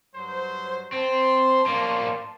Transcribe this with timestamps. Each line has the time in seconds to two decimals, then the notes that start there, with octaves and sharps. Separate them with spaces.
0.15 G2 F#3 C5
0.92 C4 A5 C6
1.66 A#3 D4